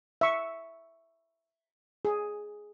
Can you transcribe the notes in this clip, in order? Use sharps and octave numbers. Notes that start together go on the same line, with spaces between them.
E5 C#6
G#4